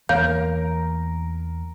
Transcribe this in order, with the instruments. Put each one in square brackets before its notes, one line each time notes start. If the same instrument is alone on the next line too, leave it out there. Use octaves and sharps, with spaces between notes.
[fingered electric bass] E2 E3 A#3 [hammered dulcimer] A#4 [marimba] C#5 G6 [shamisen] F5